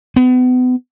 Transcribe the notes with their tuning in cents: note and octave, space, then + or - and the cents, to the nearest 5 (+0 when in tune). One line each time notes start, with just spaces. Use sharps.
B3 +35